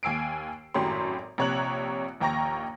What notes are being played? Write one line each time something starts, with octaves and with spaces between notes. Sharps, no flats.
D#2 G#5 E6 C7 D7
G#1 F#2 A2 F#3 G4 C6
A#1 C3 C#5 A#5 F#6 F#7
A#1 D#2 G5 A#5 C#6 A#6